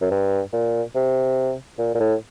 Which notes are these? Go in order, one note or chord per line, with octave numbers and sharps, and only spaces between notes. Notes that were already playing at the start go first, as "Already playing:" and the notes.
F#2
G2
A#2
C3
A#2
A#2
A2